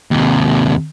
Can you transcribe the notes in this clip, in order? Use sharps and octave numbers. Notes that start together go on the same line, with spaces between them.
D#2 C3